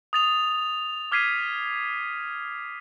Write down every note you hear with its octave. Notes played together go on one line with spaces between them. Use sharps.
D#6 A6 F7
D6 F6 G#6 B6 C7 D#7